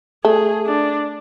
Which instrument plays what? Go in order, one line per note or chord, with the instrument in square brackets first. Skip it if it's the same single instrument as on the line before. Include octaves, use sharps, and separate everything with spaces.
[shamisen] A3 [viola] G#4
[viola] D4